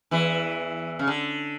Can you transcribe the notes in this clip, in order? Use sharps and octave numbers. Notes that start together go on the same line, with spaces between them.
E2 E3
C#3
D3